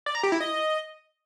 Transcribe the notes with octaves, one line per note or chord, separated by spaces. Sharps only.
D5
A#5
G4
E4
D#5